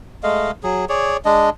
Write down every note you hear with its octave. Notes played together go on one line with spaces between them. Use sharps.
G#3 A3 D#5 F5
F#3 G#4
G#4 C#5 D5
G#3 D4 D#5